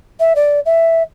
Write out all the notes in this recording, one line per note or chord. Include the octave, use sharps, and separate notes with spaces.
E5
D5
E5